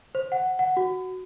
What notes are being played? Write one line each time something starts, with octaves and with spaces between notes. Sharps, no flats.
C5
F#5
F#5
F#4